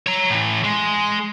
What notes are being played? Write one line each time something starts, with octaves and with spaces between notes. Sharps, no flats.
C#5 A#5
A2 E3
G#3